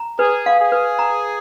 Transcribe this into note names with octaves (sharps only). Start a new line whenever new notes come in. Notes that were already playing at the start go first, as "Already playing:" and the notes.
Already playing: A#5
G#4 B4
F5
G#4
B4
A#5